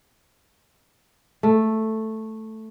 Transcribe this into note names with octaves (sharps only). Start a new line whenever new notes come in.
A3